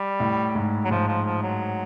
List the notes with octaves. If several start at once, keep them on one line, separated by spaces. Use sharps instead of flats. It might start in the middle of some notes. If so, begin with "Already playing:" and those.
Already playing: G3
A2
G#2
F#3
G#2 F3
F3
F3
F#3